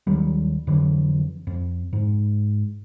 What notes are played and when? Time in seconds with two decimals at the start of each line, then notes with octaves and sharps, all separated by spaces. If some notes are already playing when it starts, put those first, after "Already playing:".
0.07 D#2 D#3 F#3 G3
0.67 F2 D3 E3 F#3
1.47 F2
1.93 G#2